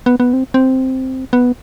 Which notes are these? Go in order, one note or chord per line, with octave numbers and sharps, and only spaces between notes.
B3
B3
C4
C4
B3